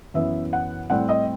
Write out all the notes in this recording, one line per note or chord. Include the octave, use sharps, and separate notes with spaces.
F#2 E3 B3 E5
F#5
A2 G3 C4 F#5
D#5